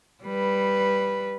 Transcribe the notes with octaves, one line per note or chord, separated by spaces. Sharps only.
G3 B4